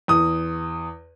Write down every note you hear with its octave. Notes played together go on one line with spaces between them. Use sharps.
E2 D#6